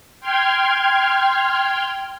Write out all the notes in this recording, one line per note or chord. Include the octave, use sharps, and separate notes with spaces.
G5 C6 F6 G#6